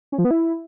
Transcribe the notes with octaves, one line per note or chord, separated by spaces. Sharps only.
C#4
F3
B3
E4